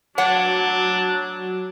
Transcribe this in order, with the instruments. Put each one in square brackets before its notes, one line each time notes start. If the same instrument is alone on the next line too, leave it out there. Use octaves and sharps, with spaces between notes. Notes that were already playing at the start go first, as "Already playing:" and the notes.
[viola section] F#3 [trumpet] D4 [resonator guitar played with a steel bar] C#5 F#5